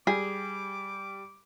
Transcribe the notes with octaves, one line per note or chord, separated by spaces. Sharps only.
G3 G#4 D6